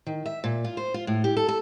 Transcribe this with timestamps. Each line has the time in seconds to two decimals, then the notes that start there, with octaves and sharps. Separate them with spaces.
0.07 D#3
0.26 E5
0.44 A#2
0.64 F4
0.77 C5
0.94 F4
1.07 A2
1.24 G4
1.37 A4
1.48 A4